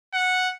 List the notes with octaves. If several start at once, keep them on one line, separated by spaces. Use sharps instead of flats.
F#5